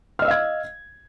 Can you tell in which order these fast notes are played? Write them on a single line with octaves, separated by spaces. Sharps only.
F6 D#5 E6 F5 G#6